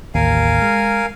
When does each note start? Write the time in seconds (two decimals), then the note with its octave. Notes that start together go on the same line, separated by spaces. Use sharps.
0.15 A1 D#2 A#4 F5 G#5
0.62 G#3